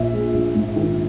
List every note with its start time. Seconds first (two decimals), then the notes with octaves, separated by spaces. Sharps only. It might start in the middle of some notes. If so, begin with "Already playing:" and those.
Already playing: A#1 A#2 E5
0.13 G#3
0.33 A#1
0.55 G#2
0.76 D#3